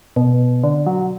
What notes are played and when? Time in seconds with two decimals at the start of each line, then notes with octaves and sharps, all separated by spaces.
0.16 B2
0.64 D3
0.86 F#3